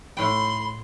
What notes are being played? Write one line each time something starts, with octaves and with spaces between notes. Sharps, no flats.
A2 G5 B5 C6